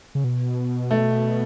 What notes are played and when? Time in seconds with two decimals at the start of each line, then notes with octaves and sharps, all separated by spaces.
0.15 C#3
0.24 B2
0.91 A3